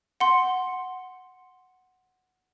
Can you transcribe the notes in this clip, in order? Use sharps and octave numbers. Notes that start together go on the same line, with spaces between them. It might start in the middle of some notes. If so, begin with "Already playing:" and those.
F#5 C6